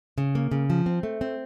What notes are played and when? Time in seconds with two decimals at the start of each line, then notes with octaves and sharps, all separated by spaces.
0.18 C#3
0.35 A#3
0.51 C#3
0.70 F3
0.86 C4
1.03 A3
1.21 C4